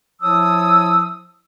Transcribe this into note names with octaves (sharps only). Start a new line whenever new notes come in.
F3 E4 C#5 A5 D#6 E6